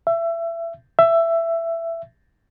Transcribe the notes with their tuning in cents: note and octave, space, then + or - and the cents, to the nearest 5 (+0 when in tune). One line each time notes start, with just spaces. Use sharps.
E5 +25
E5 +15